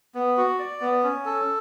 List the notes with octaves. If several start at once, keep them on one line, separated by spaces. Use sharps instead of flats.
B3
F#4
D5
B3
C#4
A4